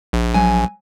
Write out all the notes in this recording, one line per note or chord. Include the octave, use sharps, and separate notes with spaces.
A#1
F#3 G#5